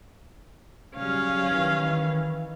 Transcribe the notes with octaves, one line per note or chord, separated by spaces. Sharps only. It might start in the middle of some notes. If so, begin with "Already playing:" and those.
C#3 F#3 G3 C#4 F5
D#3 E3